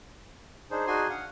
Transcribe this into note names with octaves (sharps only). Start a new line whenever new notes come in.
D4 D#4 G#4 C5
D4 D#4 F#4 G#4 G#5 C6
F5 F#5